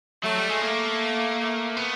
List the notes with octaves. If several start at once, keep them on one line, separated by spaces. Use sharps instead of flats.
F#3 A3
G3
G#3
A3 A#3
A3
B3